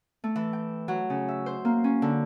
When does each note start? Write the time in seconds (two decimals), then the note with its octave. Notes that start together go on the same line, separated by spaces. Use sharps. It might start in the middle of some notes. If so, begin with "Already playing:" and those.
0.24 A3
0.36 E3
0.53 G5
0.88 F#3
1.10 C#3
1.28 E5
1.46 C5
1.65 A#3
1.84 C#4
2.02 D3